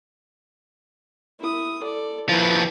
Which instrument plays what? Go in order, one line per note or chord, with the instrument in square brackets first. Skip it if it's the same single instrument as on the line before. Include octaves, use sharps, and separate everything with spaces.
[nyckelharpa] E4 D#6
A4 D5
[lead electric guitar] D#2 F3 [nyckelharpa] E4 B4